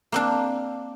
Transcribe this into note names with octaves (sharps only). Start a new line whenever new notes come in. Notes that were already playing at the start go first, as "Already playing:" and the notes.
A#3 C4 D4